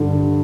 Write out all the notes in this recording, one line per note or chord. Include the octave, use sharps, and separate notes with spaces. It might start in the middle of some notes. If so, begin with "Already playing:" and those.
Already playing: G2 D3